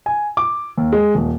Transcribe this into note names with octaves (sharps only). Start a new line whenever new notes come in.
G#5
D6
D#2
G#3
D#1